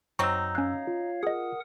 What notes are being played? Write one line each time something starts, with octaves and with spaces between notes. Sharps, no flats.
F#2 F#3 C4 D#4 C#6 E6
C#4 C#5 F5 F#6
F4
G#4 A#4 D#5 F#5 D#6